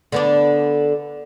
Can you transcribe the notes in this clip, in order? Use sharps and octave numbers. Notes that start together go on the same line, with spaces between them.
D3 B3 D4